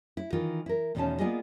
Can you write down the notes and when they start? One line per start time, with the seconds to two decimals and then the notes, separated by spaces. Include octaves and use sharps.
0.17 E4
0.33 D#3 E3 F4 A#4
0.66 E4 A#4
0.95 E2 B2 D#3 A3 C#4 A5
1.19 A#3 B3 F4 G#4 D5 D#5